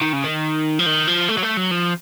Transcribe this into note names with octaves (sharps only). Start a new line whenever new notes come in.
D#3
C#3
D#3
F3
D#3
F3
A3
F#3
A3
F#3
F3